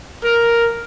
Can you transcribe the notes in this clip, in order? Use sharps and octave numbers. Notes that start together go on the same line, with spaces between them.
A#4